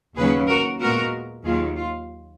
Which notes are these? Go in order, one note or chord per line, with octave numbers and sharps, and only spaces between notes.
D#2 C#3 F#3 C#4 G#4 B4
F#4 A#4
A#2 G#3 B3 F#4 A#4
D#2 D#3 F#3 F4 G#4
F4